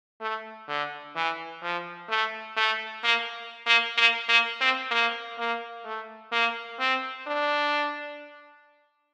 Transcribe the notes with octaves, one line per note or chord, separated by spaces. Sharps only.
A3
D3
E3
F3
A3
A3
A#3
A#3
A#3
A#3
C4
A#3
A#3
A3
A#3
C4
D4